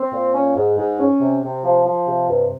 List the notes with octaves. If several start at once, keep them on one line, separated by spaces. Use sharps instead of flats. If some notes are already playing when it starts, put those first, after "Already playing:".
Already playing: C4
A#2
C#4
G#2
G#2
C#4
C3
C3
F3
F3
C3
G2